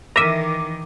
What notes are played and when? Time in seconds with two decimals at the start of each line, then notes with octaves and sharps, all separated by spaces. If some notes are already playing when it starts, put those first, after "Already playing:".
0.16 D#3 E3 A#4 E5 D6 A#6 D#7